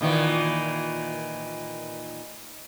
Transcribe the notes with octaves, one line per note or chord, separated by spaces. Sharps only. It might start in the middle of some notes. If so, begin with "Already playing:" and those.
A#2 D#3 E3